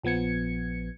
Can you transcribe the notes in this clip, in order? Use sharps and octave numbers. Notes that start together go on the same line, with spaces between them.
A#1 F3 B3 G#6 C#7